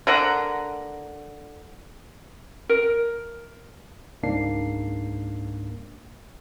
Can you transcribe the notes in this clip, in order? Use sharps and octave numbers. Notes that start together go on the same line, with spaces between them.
D3 A#4 F#5 A#5
A#4
C#2 G#2 A#3 D4 C7